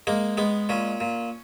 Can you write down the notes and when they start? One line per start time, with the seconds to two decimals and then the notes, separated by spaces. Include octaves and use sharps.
0.07 G#3 A#3
0.37 G#3 B3
0.69 A#2 C#4
1.00 A#2